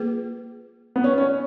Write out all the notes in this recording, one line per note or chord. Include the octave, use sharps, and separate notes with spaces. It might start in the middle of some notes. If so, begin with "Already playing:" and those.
Already playing: A#3 F4 G#4 B4
B3
C#4
C#4